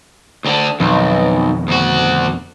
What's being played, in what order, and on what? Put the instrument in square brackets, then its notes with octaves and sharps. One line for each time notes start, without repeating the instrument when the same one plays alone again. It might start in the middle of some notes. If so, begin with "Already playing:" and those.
[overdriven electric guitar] D2 D3
[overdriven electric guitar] B1 [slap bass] F2 B2 D#3
[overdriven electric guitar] D2 F#4